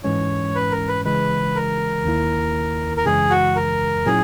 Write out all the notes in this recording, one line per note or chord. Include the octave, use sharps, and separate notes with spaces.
G#2 E3 G#3 C#4 C#5
B4
A#4
B4
C#3 E3 G#3 B4
A#4
D#2 D#3 A#3 E4
A#4
F#2 C#3 E3 G#3 G#4
F#4
A#4
A#2 F#3 C#4 E4 G#4